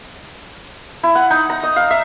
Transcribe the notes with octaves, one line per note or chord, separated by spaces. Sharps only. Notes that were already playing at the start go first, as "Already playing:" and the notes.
E4
F#5
D#4
A#5
D#5
F5
E5